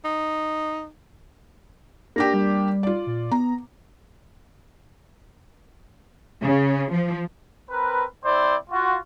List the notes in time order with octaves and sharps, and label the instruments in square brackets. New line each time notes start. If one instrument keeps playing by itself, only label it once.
[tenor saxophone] D#4
[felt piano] A#3 D4 G4 [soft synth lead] A#6
[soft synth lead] G3
[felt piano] F4 D5
[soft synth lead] A#2
[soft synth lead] B3 [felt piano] A#5
[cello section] C#3
F3
[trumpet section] C4 A#4 B4
C4 E4 C5 D5
F4 F#4